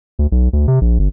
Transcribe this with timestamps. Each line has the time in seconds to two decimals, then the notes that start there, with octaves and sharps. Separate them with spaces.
0.19 D2
0.32 B1
0.53 D2
0.68 C3
0.81 A#1
0.99 G1